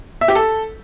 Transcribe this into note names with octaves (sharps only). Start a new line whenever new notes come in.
E5
G4
A4